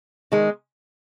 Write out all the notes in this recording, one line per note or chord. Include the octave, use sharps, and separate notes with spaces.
D#3 G#3